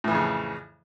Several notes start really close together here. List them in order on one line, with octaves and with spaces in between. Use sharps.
A2 E3 F2 C#3